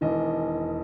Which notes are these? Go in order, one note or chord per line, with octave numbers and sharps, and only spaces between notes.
E1 E2 D#3 D#5